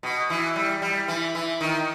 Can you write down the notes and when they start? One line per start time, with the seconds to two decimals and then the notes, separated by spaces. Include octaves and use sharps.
0.03 B2
0.30 E3
0.56 G3
0.82 G3
1.08 E3
1.35 E3
1.61 D#3